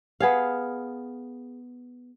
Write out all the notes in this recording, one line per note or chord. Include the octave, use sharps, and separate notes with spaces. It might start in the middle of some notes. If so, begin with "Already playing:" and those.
B3 G#4 F5